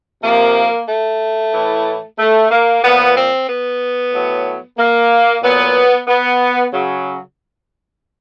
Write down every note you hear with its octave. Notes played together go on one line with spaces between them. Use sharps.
C3 F3 A#3
A3
A2 E3
A3
A#3
A#2 F3 B3
C4
B3
A2 F#3
A#3
A#2 F#3 B3
B3
C#3 F#3